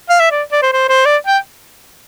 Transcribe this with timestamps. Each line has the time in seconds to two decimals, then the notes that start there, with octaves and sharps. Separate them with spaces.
0.09 F5
0.20 E5
0.31 D5
0.52 D5
0.63 C5
0.73 C5
0.89 C5
1.06 D5
1.27 G5